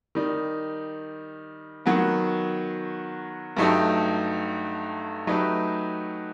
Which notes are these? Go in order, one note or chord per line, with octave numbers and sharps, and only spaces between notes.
D#3 G3 D#4
D#3 F#3 B3 F#4
G2 F#3 A3 D#4 G4
F#3 A3 D#4 G4 B4